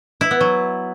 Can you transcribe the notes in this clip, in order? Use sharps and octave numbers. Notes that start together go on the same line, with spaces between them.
E4
B3
F#3